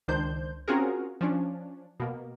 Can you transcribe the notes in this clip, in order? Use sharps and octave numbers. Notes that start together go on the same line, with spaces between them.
C#2 D#3 D4 C5 G6
C4 C#4 F4 F#4 G#4 A#4
F3 C#4 D4
B2 A#3